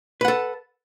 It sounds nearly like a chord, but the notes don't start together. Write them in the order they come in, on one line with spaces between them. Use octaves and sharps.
B4 F#5 A4